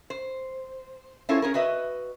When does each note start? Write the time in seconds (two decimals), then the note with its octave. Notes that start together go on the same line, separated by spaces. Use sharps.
0.10 C5
1.29 C#4 E4 F4 A4 A#4 C5
1.42 C#4 G#4 A#4
1.54 F#4 B4 D#5 E5